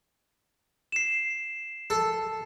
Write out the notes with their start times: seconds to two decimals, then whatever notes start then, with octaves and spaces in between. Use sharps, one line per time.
0.92 C7 E7
1.90 A4